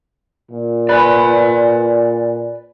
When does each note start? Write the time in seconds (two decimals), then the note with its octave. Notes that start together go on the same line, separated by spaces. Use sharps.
0.51 A#2
0.89 B4 D5 G#5